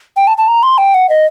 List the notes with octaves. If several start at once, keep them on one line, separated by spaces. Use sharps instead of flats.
G5
A5
A5
A#5
C6
G5
F#5
D#5